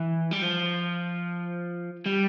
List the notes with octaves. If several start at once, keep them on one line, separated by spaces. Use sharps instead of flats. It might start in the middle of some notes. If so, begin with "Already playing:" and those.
Already playing: E3
G3
F3
G3